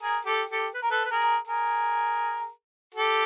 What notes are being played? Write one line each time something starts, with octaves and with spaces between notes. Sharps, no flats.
G#4 A#4
G4 A4
G4 A4
B4
A#4
A4 B4
B4
G#4 A#4
G#4 A#4
G4 A4